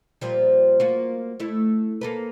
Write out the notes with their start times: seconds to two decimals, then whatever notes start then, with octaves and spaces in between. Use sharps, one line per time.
0.21 A#2 F3 G3
0.80 A#3 F4 F#4
1.40 A3 E4
2.01 A#3 A4 B4